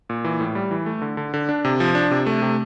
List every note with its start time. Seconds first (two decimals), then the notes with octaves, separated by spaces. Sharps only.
0.10 A#2
0.25 E3
0.40 A2
0.55 G3
0.71 E3
0.86 A3
1.02 D3
1.17 D3
1.34 D3
1.49 D4
1.65 C3
1.80 F3
1.95 D4
2.11 C3
2.26 A3
2.42 C3